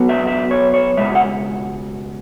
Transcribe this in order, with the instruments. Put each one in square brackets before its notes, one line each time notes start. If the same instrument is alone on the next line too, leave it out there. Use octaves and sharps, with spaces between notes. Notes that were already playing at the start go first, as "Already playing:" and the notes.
Already playing: [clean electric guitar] B1 B2 F#3 B3
E5
E5
C#5
C#5
C#2 B2 G#3 E5
F#5